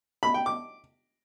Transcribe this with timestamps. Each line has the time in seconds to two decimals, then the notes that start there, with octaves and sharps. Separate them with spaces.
0.23 B5
0.34 G5
0.46 D6